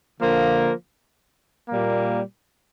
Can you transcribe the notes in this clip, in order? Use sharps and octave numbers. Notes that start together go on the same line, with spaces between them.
D3 F3 A#3
A#2 G3 A#3